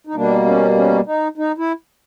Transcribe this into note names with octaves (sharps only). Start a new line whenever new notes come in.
D#4
B2 G3 A#3 D4
C#4
C#4
D#4
D#4
E4